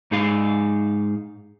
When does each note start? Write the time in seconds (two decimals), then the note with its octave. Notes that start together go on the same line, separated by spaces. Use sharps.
0.11 G#2 D#4 G#4 F5